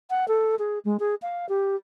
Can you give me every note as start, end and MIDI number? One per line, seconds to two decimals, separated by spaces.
0.10 0.27 78
0.28 0.55 69
0.59 0.79 68
0.85 0.97 56
1.00 1.15 68
1.22 1.48 77
1.49 1.76 67